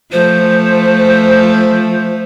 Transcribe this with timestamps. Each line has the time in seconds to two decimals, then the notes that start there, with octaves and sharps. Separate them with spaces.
0.12 F3 A3 C5